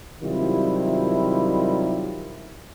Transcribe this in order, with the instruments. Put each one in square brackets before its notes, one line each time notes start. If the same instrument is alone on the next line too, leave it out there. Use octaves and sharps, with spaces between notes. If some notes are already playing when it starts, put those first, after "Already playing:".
[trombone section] C3 D#3 F#3 G3 E4 F4